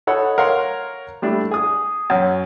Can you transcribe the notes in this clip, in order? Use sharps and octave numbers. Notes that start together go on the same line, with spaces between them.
D#4 A4 C#5 F#5 B5
A#4 C#5 F5 F#5 C6
G3 A3 D4 E4
G#4 D#6
F#2 C#4